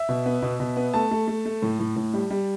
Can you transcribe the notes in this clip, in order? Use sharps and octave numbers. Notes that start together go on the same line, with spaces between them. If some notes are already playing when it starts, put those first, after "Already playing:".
Already playing: E5
B2
B3
B2
B2
B3
A3 A5
A3
A3
A3
A2
A2
A2
G3
G3